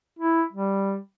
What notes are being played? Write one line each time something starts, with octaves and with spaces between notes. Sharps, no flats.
E4
G3